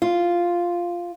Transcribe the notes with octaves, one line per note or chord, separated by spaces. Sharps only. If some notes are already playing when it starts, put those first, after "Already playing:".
F4